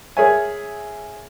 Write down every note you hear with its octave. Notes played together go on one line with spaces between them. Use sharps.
G#4 A#4 C#5 E5 G#5